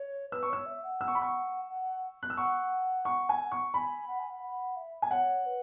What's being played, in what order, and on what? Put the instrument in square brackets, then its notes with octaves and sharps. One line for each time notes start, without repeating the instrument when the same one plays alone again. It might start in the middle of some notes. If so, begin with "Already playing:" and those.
Already playing: [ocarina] C#5
[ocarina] B4 [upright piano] E6
[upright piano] C#6
[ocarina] C#5 [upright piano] E6
[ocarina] E5
F#5
[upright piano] E6
C#6
B5
C#6
[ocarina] F#5
[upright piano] F#6
E6
[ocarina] F#5 [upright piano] C#6
[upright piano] C#6
G#5
C#6
[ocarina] G#5 [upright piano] B5
[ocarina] F#5
G#5
F#5
F#5
E5
[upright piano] G#5
[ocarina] C#5 [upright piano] F#5
[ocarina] B4